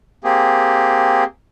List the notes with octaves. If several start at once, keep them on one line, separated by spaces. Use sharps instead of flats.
A#3 C4 G4 G#4